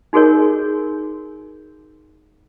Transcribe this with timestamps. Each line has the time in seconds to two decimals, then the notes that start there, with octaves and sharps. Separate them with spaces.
0.13 D#4 F#4 G#4 A#4 C#5